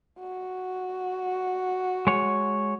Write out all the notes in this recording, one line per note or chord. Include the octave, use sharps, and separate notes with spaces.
F#4
G#3 C#5